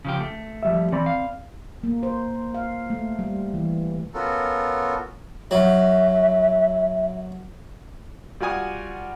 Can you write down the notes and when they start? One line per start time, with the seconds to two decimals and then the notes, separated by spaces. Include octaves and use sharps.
0.05 C#3 F3 G4
0.20 A3
0.63 F3 G3 E5
0.92 E3 C4 D5 B5
1.06 F5
1.83 A#3
2.03 C5
2.54 F5
2.90 A3
3.19 G3
3.54 E3
4.14 B3 C#4 F4 F#4 A4 A#4
5.51 F#3 E5
8.40 G3 F4 F#4 G#5 D#6